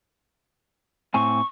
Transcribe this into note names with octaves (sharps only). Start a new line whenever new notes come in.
A2 C4 G#5 C#6